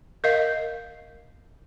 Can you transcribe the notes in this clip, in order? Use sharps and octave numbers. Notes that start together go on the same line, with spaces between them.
A#4 D#5 F5